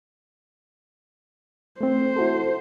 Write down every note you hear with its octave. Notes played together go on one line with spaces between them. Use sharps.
A3 C4 C5
E4 F#4 A4